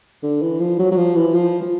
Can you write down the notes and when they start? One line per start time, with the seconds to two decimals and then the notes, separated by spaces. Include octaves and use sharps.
0.23 D3
0.42 E3
0.60 F3
0.79 F#3
0.92 F#3
0.97 F3
1.16 E3
1.34 F3
1.62 F3